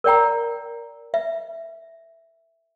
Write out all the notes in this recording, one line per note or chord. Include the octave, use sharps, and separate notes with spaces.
A#4 D5 G5 A#5
E5